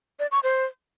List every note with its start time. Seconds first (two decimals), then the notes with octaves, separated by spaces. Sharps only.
0.19 D5
0.31 C#6
0.43 C5